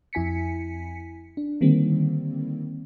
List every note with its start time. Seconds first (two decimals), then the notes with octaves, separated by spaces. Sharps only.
0.13 F2 E4 G#5 B6 C#7
1.37 D4
1.61 D3 D#3 G3 A#3 C4